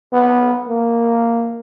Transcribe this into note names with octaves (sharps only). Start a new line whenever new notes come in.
B3
A#3